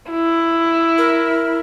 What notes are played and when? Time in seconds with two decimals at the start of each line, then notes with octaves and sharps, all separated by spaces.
0.11 E4
0.98 A#4